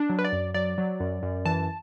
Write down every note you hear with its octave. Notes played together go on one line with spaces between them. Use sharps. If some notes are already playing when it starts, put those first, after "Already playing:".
Already playing: D4
F#3
B4
D5
F#2
F#3 D5
F#3
F#2
F#2
E3 A5